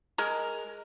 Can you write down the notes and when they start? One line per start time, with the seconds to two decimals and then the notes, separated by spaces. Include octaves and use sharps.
0.18 G#3 A#4